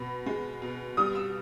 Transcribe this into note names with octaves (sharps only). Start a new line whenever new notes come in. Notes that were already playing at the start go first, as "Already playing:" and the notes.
Already playing: B2 B5
G#3
B2
G3 D#6
E6